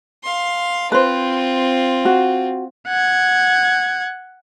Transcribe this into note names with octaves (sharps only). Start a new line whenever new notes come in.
F5 C6
C4 F4 B4 C5
F#4
F#5 G#6